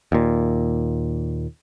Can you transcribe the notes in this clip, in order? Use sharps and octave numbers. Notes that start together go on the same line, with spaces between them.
D#2 A#2